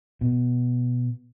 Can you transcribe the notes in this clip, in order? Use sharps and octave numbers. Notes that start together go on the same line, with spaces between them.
B2